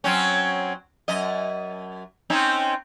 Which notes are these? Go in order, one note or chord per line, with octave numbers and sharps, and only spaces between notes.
F#3 C4 C#4
F#2 D#5
C4 C#4 D#4